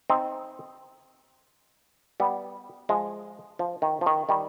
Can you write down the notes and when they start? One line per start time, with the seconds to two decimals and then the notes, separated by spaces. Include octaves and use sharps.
0.10 C4 D#4
2.20 G3 B3
2.89 F3 G#3
3.59 F3
3.82 D#3
4.01 F3
4.06 D#3
4.29 D#3 G3